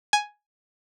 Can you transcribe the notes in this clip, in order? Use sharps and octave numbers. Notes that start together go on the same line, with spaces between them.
G#5